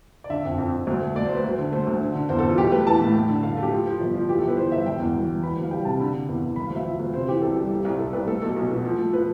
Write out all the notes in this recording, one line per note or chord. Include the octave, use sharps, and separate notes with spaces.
D5
D3 E5
F2
F2
F2
D2
A3
A3 D5
C5
D2 B4
D2
D3
A3 C5
D2
D3
D3
E2 C5
A4
E2
F4
B1 G4
A3 B4
E3 A5
A2
A3
D3
A3 F5
A3
G4
F3
F3
G1
F3
E3 G4
A4
G1
B4
E3 C5
G1 E5
E1 G5
E2
E1
E1
E3 B5
D2
F5
G3 G5
C3 A5
D3 B5
D3
E2
E2
E1 B5
F5
D2
E5
F3
D2
C3 C5
E3 G4
C2 A4
G3 G4
C2
C2
C2 A4
C2 B4
A3 A4
B1 A4
B1 A4
B2
F3
A3
F3 B4